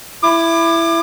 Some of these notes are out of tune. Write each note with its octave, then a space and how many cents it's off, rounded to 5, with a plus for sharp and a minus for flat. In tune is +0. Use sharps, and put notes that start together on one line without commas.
E4 +10 D6 +30